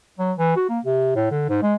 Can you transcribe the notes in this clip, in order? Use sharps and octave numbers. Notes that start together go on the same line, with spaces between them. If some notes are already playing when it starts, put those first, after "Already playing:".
F#3
E3
F#4
A#3
C3
A2
D3
G#2
G#3